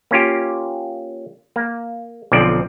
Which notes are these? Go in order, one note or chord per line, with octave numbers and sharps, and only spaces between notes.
A#3 C#4 F4 G4
A#3
B1 D3 F3 C4 D5